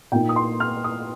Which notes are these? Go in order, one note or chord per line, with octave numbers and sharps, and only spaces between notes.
A#2 A#3 D#4 G5
D#6
C6
F6
D#6